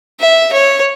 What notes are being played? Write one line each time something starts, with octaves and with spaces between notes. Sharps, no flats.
E5
C#5